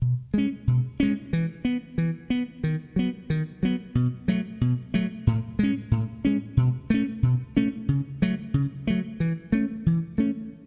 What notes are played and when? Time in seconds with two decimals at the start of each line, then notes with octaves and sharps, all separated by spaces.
0.02 B2
0.34 G#3 C#4
0.67 B2
1.00 G#3 C#4
1.33 E3
1.65 B3
1.98 E3
2.30 B3
2.64 D#3
2.96 F#3 B3
3.30 D#3
3.63 F#3 B3
3.95 B2
4.28 F#3 A3
4.61 B2
4.94 F#3 A3
5.27 A2
5.59 G#3 C#4
5.91 A2
6.25 G#3 C#4
6.57 B2
6.90 A3 C#4
7.23 B2
7.57 A3 C#4
7.89 C#3
8.22 F#3 A3
8.54 C#3
8.87 F#3 A3
9.20 E3
9.52 A3 C#4
9.86 E3
10.18 A3 C#4